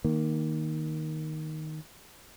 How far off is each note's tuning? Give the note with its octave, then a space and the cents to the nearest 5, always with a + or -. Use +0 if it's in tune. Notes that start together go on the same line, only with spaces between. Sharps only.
D#3 +0 A#3 +5